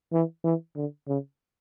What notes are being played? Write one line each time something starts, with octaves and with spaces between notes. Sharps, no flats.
E3
E3
D3
C#3